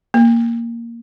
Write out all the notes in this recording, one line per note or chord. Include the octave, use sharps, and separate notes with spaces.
A#3